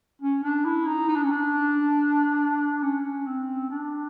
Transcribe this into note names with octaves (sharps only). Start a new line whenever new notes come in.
C#4
D4
E4
D#4
D#4
D4
C#4
D4
C#4
C4
D4